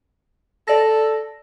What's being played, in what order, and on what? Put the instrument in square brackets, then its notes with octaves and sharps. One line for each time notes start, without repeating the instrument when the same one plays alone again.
[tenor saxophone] A4 [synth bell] D5 A#6